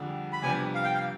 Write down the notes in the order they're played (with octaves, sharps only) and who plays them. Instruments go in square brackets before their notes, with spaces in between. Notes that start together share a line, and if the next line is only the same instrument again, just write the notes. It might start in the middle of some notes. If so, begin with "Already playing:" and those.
Already playing: [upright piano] F2 D3 G3 D4 G#4
[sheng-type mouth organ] B5
[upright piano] F2 C3 G3 B3 D4 [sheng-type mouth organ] G#5
[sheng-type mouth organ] F5
G5
F5